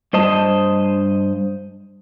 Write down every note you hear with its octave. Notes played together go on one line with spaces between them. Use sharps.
G2 C5 D#5 A5